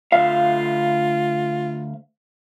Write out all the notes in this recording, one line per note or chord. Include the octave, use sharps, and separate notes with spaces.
D2 F4 E5 F5